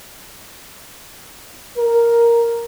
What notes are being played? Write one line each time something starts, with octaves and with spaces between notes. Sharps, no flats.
A#4